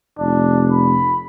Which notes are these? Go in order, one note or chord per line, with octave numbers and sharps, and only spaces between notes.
F1 D4
B5